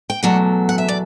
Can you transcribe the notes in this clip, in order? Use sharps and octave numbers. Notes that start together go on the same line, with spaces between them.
G5
E2 B2 F#3 A3 D5 F#5
F#5
E5
D5